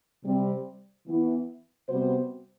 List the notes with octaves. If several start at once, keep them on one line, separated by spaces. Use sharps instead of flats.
C3 G3 C4
E3 B3 E4
C3 G3 B3 F#4 C5